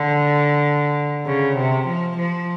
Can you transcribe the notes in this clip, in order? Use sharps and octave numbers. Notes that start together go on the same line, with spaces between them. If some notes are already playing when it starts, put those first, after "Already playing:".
Already playing: D3
C#3
C3
F3
F3